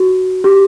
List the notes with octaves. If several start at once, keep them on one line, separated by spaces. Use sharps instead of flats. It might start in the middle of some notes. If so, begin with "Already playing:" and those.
Already playing: F#4
G4